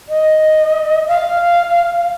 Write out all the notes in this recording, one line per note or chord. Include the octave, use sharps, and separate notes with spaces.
D#5
F5